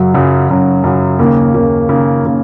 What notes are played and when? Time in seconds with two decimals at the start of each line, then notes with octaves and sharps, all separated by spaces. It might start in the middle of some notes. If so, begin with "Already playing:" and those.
Already playing: F#2 C#3 F#3
0.14 F#2 C#3 F#3
0.49 F#2 C#3 F#3
0.84 F#2 C#3 F#3
1.19 D#2 C#3 A#3
1.54 D#2 C#3 A#3
1.89 D#2 C#3 A#3
2.25 C#3 A#3